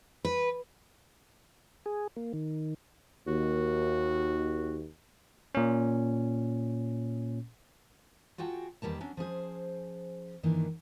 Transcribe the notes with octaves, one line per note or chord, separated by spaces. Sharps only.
B4
G#4
A#3
D#3
D#2 F#4
A#2 C#4
F4 F#4 G#4 G5 A5
E2 D#3 G3 A#3 A5
F#3 C#4 D4
F3 C#4 G#4 C5
G2 D#3 E3 A#3 D4